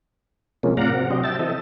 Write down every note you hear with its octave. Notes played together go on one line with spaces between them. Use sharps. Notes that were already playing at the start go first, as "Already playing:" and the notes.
C3 F3 G#3 A#3 C#4
A2 C3 D5 F5 F#5 A#5
C4 F#4
C3 F#3 D4 G4 C5 D#5
E5 G5 A5 A6
E3 C4 A4 D#5 E5